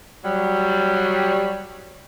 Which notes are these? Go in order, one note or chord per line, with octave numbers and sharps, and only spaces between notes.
F#3 G3